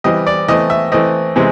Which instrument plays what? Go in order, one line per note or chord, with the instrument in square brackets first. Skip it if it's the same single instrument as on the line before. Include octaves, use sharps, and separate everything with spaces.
[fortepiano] E3 G3 C4 D#5
D5
E3 A3 C4 D#5
E5
E3 A3 C4 D#5
C3 E3 G#3 C4